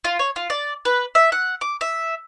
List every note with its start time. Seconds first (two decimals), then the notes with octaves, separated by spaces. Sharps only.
0.04 F4
0.19 C#5
0.36 F4
0.50 D5
0.85 B4
1.15 E5
1.32 F#5
1.61 D6
1.81 E5